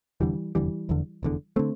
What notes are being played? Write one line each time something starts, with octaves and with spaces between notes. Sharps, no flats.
F1 E2 D3 E3 G3
F1 E2 D3 E3 G3
F1 E2 D3
F1 E2 D3
D3 A3 C4